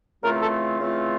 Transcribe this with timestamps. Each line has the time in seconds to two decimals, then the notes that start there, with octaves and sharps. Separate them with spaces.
0.23 C#3 E3 A3 C4 F4 A#4
0.42 A4
0.80 C#3 E3 A3 C4 F4